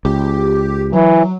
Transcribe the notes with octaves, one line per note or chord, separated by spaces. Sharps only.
C#2 G4
E3 F#3